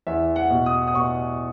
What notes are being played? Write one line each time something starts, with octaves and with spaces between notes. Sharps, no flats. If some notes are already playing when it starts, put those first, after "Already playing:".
E2 E5
F#5
B2
D#6
D#6
B2 C#6